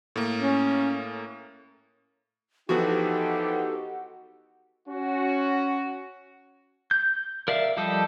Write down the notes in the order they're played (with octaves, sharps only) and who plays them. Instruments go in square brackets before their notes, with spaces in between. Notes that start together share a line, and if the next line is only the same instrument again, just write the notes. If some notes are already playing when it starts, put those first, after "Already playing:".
[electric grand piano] A2 A#3
[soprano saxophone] C#4
[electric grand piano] E3 F3 B3 [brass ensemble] D#4 G4 [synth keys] F#4 [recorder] A4
[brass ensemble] C#4 F#4
[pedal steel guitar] G6
A#4 D5 E5 F5
F3 G3 G4 A4 D#5